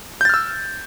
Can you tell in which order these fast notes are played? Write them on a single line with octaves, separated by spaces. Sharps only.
G6 A6 F6 E6